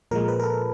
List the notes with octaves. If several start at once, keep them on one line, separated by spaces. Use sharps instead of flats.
A#2 F3 G#3 A#4
B4
A#4
A4